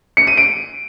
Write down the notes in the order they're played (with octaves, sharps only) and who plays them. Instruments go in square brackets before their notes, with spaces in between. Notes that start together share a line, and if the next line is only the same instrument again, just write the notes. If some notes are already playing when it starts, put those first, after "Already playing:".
[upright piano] C#7
D#7
D7